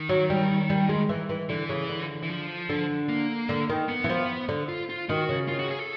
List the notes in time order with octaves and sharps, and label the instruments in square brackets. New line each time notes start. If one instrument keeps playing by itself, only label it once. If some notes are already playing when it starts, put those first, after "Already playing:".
Already playing: [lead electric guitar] D#3
[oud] F#3
G3
G3
G#3
E3
E3
[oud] D3 [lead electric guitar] E3
[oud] C#3
D3
[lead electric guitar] E3
F3
[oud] D3
[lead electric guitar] A#3
[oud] D3
D#3
[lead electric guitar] B3
[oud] E3
F3
D3
[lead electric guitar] F4
F4
[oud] D#3 [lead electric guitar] F#4
[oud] C#3
[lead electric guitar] F4
F#4
G#4
A4